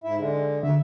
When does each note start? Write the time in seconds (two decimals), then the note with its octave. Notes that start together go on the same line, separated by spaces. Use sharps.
0.04 G#2 E4 E5
0.17 D3 G#3
0.63 D3 E5